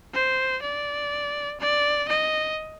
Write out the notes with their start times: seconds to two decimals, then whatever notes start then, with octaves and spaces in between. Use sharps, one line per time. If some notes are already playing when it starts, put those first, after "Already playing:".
0.14 C5
0.62 D5
1.60 D5
2.08 D#5